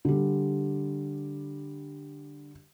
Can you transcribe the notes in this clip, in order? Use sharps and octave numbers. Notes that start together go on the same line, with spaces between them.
D3 G3